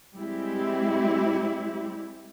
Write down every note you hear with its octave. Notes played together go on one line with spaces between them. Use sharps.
G3 G#3 C4 E4 G4